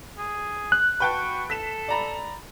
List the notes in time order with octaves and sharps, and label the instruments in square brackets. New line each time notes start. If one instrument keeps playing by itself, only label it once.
[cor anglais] G#4
[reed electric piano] F#6
[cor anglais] F#4 [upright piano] B4 G5 A5
[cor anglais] A4 [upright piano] B6 E7
[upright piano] D5 A#5 B5